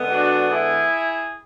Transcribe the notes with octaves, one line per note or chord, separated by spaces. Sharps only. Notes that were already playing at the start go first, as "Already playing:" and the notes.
Already playing: D3 G#3 B3
D4 F#4
E4 G#4